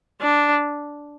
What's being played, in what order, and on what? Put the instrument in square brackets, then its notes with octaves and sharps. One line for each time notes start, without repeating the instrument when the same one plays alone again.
[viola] D4